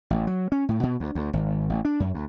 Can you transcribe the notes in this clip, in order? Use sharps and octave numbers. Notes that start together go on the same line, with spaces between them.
A1
F#3
C#4
A2
B2
D2
D2
G#1
A1
D4
F#2
D2